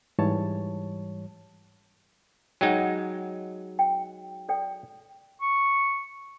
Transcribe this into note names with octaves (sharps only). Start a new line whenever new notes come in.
G#2 E3 G3 C#5 A5
F#3 G#3 D#4 F#5 G5
G5
A4 D5 G5
C#6